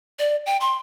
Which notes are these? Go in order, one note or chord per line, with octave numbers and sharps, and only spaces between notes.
D5
G5
C6